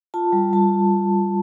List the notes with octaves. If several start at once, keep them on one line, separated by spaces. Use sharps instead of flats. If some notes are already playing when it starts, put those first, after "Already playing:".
F4 A5
G3
G3 A5